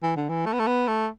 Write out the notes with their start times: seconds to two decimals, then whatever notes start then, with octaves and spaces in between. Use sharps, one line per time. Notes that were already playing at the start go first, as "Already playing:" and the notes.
0.03 E3
0.16 D3
0.29 E3
0.46 A3
0.53 B3
0.59 A3
0.67 B3
0.88 A3